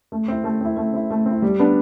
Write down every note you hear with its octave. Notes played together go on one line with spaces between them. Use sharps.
A3
C4 E4
A3
C4 E4
A3
C4 E4
A3
C4
E4
G3
B3 D4